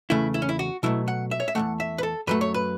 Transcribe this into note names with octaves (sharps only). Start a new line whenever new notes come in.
E2 C#3 A3 E4
E4
C#4
E4
F#4
B2 F#3 A3 E4
F#5
E5
C#5
E5
E2 E3 A3 F#5
E5
B4
A4
F#2 F#3 A3 B4
C#5
B4